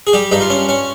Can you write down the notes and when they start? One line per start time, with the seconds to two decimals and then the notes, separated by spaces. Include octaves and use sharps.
0.07 G#4
0.13 G3 G4
0.31 G2 D#4
0.41 F4
0.50 C#4
0.69 C#4